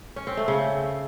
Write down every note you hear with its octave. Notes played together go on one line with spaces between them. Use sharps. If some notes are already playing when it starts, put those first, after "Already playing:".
C#4
C4
A3
C#3